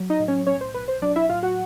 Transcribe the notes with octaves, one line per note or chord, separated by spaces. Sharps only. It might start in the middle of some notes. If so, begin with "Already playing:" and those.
Already playing: F#3
D#4 D#5
A2
C#4 C#5
B1 C#4 C#5
C5
B1 B4
C5
F#3 D4 D5
E4 E5
A2 F4 F5
F#4 F#5